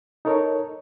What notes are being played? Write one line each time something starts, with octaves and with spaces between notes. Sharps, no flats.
D#4 A4 A#4 C#5